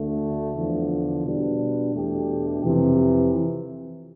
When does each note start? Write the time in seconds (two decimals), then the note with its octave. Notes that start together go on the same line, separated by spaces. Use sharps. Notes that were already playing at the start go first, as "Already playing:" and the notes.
Already playing: D2 D3 A3
0.56 E2 D3 F3
1.24 B2 G3 D4
1.94 E2 B2 A3 D4 G4
2.63 F2 C3 E3